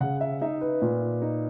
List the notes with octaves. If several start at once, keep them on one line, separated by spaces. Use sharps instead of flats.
C#3 F#5
E5
D#4 E5
B4
A#2
D#4